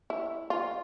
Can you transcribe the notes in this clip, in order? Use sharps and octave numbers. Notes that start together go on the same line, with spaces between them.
E4
F4